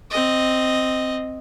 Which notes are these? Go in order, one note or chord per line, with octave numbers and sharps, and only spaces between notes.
C4 D#5